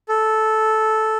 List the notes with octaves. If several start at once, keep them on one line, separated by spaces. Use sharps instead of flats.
A4